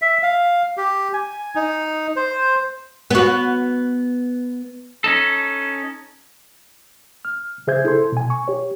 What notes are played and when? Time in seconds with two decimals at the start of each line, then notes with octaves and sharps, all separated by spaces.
0.02 E5
0.23 F5
0.77 G4
1.13 G#5
1.55 D#4
2.16 C5
3.11 B3 F#4
5.04 C#4 D#4 A4
7.25 F6
7.67 C#3 G#4 C5 E5 G6 G#6
7.85 E4 A4 C6
8.12 B2 G#5
8.30 C#6
8.48 G4 C#5